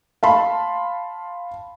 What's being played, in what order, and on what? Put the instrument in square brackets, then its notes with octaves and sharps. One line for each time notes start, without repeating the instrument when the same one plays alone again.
[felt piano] F5 A5 B5 C6